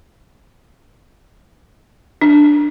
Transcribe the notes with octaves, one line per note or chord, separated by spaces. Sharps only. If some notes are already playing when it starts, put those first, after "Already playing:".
D4